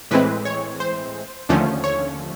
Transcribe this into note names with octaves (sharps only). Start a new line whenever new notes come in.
A2 E3 G#3 C4 B4
C#5
C5
D#2 D3 F3 A3 C#4
C#5